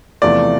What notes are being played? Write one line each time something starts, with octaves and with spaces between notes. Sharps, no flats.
E2 C3 F3 A3 D5